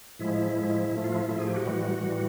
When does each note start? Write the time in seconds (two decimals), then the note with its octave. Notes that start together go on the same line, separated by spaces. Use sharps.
0.19 A2 F3 G#3 E4
0.56 A2 F3 G#3
0.92 A2 F3 A3
1.04 F4
1.16 E4
1.28 A2 F3 A3 E4
1.38 G#4
1.47 G4
1.56 F#4
1.65 A2 E3 G3
2.01 A2 E3 G3